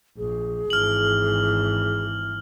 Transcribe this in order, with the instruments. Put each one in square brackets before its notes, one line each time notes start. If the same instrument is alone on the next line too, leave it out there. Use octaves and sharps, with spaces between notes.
[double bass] A#1 [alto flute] G#4
[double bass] G#1 E3 [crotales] F6 F#7